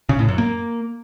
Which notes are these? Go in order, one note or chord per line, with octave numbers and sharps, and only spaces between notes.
C#3
A2
F#2
A#3